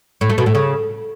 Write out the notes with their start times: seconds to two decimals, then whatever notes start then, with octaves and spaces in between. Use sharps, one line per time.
0.21 A2
0.29 A3
0.38 B2
0.46 A2
0.55 C#3